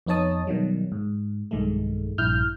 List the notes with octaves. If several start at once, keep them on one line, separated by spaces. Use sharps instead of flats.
F2 B3 D#4 C#5 A5 D#6
B2 D#3 F#3 G3
G#2
B1 G2 D#3 G#3 A3
A#1 G2 E4 F6 G6